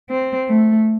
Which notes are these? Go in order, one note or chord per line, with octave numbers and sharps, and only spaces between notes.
C4
A3